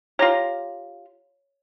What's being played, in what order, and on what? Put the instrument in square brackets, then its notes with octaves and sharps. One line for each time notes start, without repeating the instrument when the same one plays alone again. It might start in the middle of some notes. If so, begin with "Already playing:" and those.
[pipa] F4 G4 [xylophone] C#5 A#5 A#6